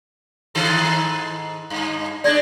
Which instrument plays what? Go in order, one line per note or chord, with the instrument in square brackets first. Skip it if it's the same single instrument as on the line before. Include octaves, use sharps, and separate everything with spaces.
[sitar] G#2 D#3 A4
[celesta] C7
[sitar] G2
[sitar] G#3 D4 [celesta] D5 G#6 A#6